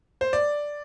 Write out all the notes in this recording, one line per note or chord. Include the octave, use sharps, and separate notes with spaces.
C5
D5